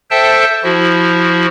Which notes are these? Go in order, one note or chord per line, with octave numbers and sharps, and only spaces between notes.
A4 C5 E5 G5 A5
F3 E4 F#4